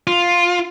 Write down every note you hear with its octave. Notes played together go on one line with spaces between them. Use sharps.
F4